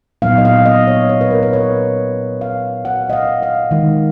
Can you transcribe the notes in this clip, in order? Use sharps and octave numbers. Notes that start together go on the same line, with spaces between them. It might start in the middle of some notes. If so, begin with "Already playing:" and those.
A#2 F#3 B3 D#4 F5
D#5
F5
D#5
C#5
C#5
B4
A#4
B4
C#5
F5
F#5
D#5
F5
F5
D#3 G#3 D#4